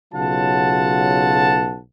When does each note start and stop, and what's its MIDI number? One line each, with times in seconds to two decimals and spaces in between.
0.14 1.78 35
0.14 1.78 49
0.14 1.78 54
0.14 1.78 65
0.14 1.78 78
0.14 1.78 81